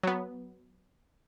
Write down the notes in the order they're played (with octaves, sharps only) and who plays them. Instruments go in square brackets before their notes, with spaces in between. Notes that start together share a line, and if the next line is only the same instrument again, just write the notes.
[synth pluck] F#3 B3